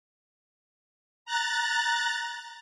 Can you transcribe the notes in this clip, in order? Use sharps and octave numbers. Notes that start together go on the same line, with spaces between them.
A#5 F#6 A6